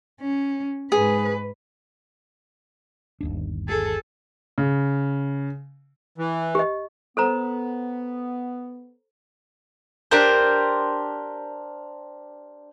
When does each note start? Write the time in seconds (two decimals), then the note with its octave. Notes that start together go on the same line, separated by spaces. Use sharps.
0.21 C#4
0.92 G#2 G#4 B4
3.21 G1 D#2 D4
3.68 G#4 A4
4.58 C#3
6.18 E3
6.55 G4 D#5
7.17 B3 A4 C5 A#5
10.11 D4 G4 A#4 C5